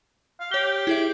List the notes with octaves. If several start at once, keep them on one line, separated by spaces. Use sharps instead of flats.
F5
G4 C#5 G7
E4 G#4 E5